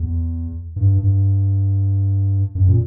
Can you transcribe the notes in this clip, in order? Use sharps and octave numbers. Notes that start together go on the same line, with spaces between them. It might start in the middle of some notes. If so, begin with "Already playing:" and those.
Already playing: E2
G2
G2
F#2
A#2